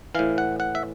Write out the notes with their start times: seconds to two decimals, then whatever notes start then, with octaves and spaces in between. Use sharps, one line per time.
0.15 A2 E3 F5
0.38 F#5
0.60 F#5
0.75 E5